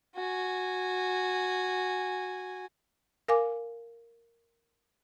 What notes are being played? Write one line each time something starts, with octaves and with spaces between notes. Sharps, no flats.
F#4 G#5
A#4 F5 G#5 D6